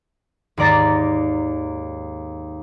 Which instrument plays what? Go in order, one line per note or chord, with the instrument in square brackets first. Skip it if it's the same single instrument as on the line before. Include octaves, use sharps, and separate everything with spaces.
[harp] D#2 G#2 D5 A#5 A6